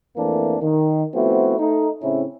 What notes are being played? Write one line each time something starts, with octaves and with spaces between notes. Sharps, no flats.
F2 E3 A3 A#3 C4 D4
D#3
F3 A3 B3 C4 E4 F#4
A3 D#4
A2 C#3 C4 C#4 E4